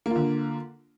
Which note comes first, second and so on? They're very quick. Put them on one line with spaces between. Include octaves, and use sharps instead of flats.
A#3 F4 D3